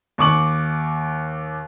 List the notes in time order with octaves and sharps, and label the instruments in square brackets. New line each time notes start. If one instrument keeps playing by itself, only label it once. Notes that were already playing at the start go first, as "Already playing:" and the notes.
[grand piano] D#2 C#6 D6 F#7